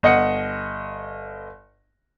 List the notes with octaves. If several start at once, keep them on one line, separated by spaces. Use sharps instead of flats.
G1 D#5 F#5 C#7